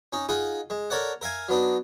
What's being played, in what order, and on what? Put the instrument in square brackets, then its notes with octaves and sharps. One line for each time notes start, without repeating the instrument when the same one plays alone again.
[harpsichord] C#4 D#4
D#4 F4 G#4 F#5
G#3
A4 A#4 C#5 D5 F#5
A#4 E5 F5 G#5
F#3 B3 D4 D#4